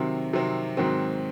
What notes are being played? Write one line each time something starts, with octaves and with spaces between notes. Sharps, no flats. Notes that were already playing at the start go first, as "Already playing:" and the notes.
Already playing: C3 D#3 F#3 C4
C3 D#3 F#3 C4
G#2 D#3 F#3 C4